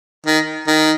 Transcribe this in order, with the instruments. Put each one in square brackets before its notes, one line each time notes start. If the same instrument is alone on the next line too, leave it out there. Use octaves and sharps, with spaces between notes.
[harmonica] D#3
D#3